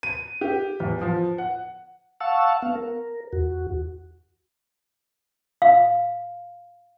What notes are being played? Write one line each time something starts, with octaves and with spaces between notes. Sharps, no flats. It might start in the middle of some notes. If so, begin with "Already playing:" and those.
D#7
G4
E2
F3
F#5
F5 F#5 A5 C#6 E6
B3 F5
A#4
E2 F#4
F5